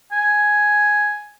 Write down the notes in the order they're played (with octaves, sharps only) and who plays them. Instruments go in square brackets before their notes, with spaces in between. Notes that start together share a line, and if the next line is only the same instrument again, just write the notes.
[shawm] G#5